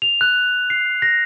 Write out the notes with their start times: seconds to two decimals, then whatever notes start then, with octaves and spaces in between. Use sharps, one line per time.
0.02 F7
0.21 F#6
0.70 C7
1.02 A#6